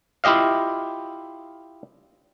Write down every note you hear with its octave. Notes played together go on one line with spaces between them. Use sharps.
E4 F4 G4 D#5 F5